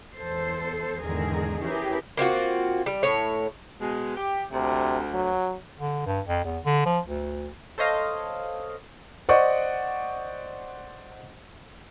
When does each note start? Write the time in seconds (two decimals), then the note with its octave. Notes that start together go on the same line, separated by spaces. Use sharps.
0.16 E2 A4 C5
1.01 E2 G#2 D3 D#3 G#4 A#4
1.61 C#4 E4 G4 G#4 A#4 B4
2.17 A#3 C4 F4 F#4
2.86 G3
3.03 A2 C#5
3.81 B2 G#3
4.17 G4
4.52 D2 C3
5.14 F#3
5.79 D3
6.06 G2
6.27 F2
6.44 E2
6.65 D3
6.85 F3
7.07 D2
7.78 A4 C5 C#5 D#5 F5
9.29 C5 D5 D#5 F#5 C#6